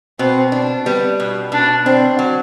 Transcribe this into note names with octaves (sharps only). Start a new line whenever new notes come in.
B2 C4
D4
G3 B3
B2
B2 D4
C4 D4
F#3